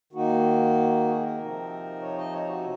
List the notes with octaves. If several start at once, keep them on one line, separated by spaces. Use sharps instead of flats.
D#3 A#3 D#4 F#4
G#4
A#4
C3 F3 C4 D#4
C#5
D#5
C#5
F#4